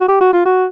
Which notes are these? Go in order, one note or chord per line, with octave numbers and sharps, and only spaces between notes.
F#4
G4
F#4
F4
F#4